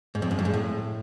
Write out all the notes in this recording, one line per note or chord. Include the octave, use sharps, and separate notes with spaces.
G#2
F2
F#2
G2
G#2
A2